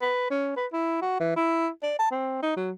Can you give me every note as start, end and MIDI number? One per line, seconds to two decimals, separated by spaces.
0.02 0.30 71
0.30 0.52 61
0.57 0.66 71
0.73 1.00 64
1.02 1.20 66
1.20 1.36 52
1.36 1.69 64
1.83 1.95 74
1.99 2.08 81
2.11 2.39 60
2.43 2.54 63
2.57 2.72 54